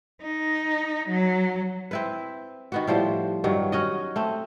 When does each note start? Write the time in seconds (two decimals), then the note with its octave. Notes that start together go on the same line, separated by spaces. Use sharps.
0.22 D#4
1.08 F#3
1.91 C4 E4 B4
2.72 D#3 B3 F#4
2.87 A2 F3 G3 C5
3.44 G2 D#3 F#3
3.72 C#4 F#4 D#5
4.16 A3 C4